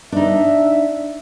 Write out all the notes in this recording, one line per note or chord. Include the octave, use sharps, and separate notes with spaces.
D4 D#4 E5